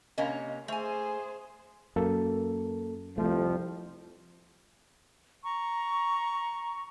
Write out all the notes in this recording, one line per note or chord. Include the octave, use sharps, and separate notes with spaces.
C3 A#3 C#4 D#5 F5 B5
A3 G#4 C5 G#5
F#2 A#3 A4
C2 F2 F3 A3
A#5 C#6